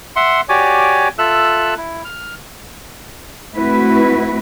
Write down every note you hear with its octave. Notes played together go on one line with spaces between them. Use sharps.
E5 F#5 C6
F#4 G4 C#5 D5 G#5 D6
F4 A4 E5 E6 F#6
E4
F6
A3 C4 E4 F#4 B4